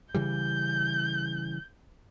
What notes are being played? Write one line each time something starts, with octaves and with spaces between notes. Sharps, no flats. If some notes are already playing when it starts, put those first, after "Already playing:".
C#3 E3 G3 G6